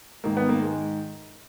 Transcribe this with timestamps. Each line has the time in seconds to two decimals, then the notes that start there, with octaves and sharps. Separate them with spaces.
0.24 G#2 D#3 A#3
0.37 B3
0.49 A#3
0.62 G#3